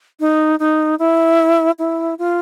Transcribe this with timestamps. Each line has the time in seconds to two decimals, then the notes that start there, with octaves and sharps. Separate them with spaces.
0.20 D#4
0.59 D#4
0.99 E4
1.79 E4
2.19 F4